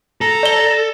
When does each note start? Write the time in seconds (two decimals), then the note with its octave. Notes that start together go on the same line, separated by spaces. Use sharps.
0.21 A4 A#5
0.43 D5 G7